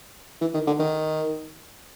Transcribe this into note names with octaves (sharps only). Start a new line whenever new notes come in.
E3
D#3
D3
D#3